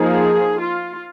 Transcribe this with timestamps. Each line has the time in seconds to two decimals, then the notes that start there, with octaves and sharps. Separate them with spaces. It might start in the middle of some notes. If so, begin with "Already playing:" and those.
Already playing: F3 A#3 D#4 G#4
0.60 F4